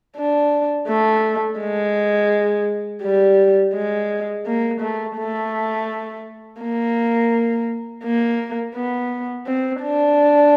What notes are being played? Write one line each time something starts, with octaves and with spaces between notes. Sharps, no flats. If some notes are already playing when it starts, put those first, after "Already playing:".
D4
A3
G#3
G3
G#3
A#3
A3
A3
A#3
A#3
B3
C4
D4